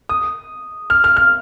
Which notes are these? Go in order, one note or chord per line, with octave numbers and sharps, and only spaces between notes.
D#6
F6
F6
F6